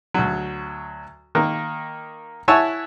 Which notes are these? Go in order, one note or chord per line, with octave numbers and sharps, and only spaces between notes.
D2 F#3
D#3 A#3
E4 C#5 E5 F#5 G#5 A5